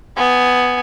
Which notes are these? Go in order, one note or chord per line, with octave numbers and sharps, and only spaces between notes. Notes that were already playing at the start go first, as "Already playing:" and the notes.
B3 G#5